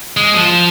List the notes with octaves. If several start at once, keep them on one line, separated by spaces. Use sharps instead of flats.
G#3
F3